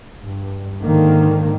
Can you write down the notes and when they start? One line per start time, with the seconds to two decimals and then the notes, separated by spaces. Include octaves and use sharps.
0.24 G2
0.82 G#2 D3 D#3 A#3